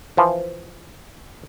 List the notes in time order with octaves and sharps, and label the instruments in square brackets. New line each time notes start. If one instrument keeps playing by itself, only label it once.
[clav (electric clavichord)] E3 F3